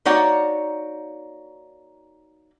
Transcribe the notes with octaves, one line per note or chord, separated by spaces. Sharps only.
A#3 D#4 F#4 C#5 D5 F#5